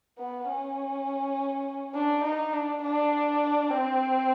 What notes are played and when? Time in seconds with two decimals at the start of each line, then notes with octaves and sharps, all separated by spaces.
0.18 B3
0.48 C#4
1.95 D4
2.24 D#4
2.53 D4
2.82 D4
3.71 C4